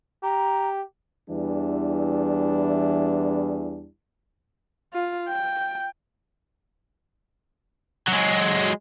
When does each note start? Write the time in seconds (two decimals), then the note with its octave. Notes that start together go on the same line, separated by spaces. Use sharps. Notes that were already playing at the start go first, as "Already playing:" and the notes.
0.23 G4 A#5
1.30 E2 E3 G3 D4 E4
4.93 F4
5.29 G5
8.08 F#3 G#3